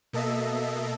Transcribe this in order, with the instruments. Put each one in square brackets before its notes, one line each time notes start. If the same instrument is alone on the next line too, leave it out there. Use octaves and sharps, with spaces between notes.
[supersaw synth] B2 A#3 A4 D#5 E5